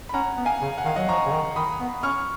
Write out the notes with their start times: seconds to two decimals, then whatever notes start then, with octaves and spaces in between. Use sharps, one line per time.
0.09 B5
0.14 C#4 F#5 A#5
0.37 B3
0.45 F5 G#5
0.61 C#3
0.78 F#5
0.85 D#3 F5
0.96 F#3 D#5 F#5
1.08 F3 A#5 C#6
1.26 C#3
1.32 D#3
1.56 D#3 B5 D#6
1.80 B3
2.03 C#4 C#6 F6